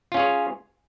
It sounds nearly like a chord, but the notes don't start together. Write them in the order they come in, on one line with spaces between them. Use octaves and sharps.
F4 C#4 G#4 C#5